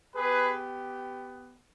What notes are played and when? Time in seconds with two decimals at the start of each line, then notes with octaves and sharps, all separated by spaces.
0.16 B3 G4 G#4 B4